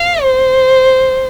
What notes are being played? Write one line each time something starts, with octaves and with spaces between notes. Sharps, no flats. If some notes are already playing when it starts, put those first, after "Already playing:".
Already playing: F5
C5